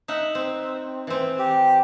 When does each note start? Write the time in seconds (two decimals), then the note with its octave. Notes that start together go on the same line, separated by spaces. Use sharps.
0.08 D#4 E5 F#5
0.35 C4
1.07 E3 C4
1.39 G4